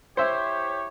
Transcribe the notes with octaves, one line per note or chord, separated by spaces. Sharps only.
E4 G4 C5 C#5 E5